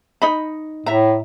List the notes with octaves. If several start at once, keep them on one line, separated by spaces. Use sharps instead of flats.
D#4 D#5 B5
A2 E5 A#5